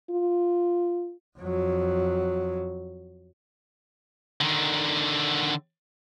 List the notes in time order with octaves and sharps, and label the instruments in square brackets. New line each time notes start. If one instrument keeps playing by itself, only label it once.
[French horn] F4
[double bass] F2 F#3
[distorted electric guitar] D3 D#3